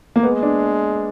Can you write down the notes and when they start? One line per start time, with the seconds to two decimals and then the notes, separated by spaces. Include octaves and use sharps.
0.16 A#3
0.23 G#3 B3
0.42 D4